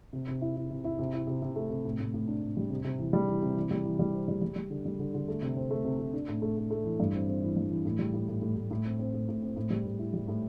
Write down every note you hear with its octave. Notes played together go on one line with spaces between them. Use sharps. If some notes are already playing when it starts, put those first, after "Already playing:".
C3
C3
E4
E4
C3
E4
C3
E4
C3
C3
A3
C3
A2
A2
A2
D4
A2
G3
C3
C3
E3
G3
E3
C3
E3
G3
E3
G3
C4
G3
G3
G3
D3
G3
D3
D3
A3
C3
C4
A3
C3
C3
D4
A2
A3
A3
A3
E3
G2
C4
C4
E3
G2
E3
A2
G3
A2
A2
A2
A2
A2
C4
C4
A2
A2
C4
A2
G3
A2
E4
G3
A2